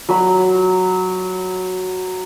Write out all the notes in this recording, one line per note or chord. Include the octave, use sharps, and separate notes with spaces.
F#3 B5